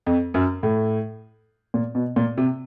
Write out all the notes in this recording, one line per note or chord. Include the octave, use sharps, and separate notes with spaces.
F2
F#2
A2
A#2
B2
A#2
C3